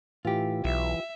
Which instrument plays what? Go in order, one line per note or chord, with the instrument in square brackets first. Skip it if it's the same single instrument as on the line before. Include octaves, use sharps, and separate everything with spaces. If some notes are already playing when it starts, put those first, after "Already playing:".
[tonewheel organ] A2 E3 [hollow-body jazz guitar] F4 G4
[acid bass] B1 [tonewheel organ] E3 [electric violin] E5